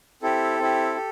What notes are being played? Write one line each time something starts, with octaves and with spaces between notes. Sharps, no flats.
C4 E4 G4 A4
C4 E4 G4
G4